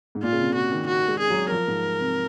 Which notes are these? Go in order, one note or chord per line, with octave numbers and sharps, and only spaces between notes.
G#2
A#2 F4
C#3
C3
C#3 F#4
D#3
F#4
G#3
G#4
F#3
F3 A#4
G#2
C3